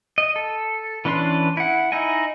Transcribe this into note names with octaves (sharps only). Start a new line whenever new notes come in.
D#5
A4
E3 C#4 D4 B4 C6
E4 F#5
D#4 E4 D#5 G#5